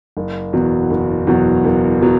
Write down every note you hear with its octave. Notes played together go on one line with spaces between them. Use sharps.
F#1
E2 B2 F#3
F#1
E2 B2 F#3
F#1
B2 F#3